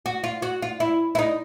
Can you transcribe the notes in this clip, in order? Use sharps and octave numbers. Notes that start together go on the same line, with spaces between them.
F#4
F4
F#4
F4
E4
E4
D#4